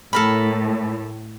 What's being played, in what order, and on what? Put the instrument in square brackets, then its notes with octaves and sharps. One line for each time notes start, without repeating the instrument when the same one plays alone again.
[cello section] A2 [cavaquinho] A4 A#4 B5